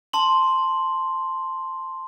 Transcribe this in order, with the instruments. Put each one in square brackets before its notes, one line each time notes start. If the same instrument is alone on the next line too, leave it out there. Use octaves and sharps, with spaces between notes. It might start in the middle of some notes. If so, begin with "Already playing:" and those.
[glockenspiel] A5 C6 F#7